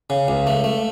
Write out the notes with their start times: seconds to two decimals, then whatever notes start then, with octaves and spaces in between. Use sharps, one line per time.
0.10 C#3
0.28 C#2
0.47 A3
0.64 A3